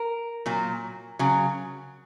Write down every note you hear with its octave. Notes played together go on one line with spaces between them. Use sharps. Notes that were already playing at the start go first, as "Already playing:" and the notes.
Already playing: A#4
A#2 F#3
C#3 F#3